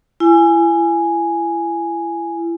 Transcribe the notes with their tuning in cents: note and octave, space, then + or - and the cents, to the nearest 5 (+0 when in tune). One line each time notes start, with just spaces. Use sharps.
E4 +35 G#5 +0